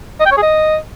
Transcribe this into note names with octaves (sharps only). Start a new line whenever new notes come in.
D#5
G5
C#5
G#4
D#5